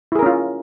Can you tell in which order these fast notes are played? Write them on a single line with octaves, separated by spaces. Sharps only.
E4 G#4 A#4 C#4 F4